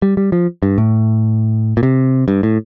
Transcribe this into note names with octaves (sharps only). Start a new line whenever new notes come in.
G3
G3
F3
G2
A2
A#2
C3
G2
A2